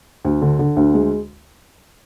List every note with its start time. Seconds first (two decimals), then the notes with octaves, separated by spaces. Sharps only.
0.25 D2
0.42 D3
0.59 D3
0.76 D2
0.94 G#3